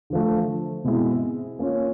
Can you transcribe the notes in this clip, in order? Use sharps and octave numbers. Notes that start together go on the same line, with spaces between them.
D3 F3 A3
B2 G#3 C4 E4
A#3 C#4 F4